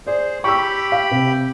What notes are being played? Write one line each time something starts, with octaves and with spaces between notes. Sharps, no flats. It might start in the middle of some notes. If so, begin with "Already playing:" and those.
G#4 C5 D5
G4 G5 B5 C#6 E6
F5
C3